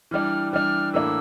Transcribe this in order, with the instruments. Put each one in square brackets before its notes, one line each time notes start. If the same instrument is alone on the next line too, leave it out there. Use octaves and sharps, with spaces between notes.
[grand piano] E3 G3 D4 [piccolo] F6
[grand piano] E3 G3 D4 [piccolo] F6
[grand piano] A2 E3 A#3 D4 [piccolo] E6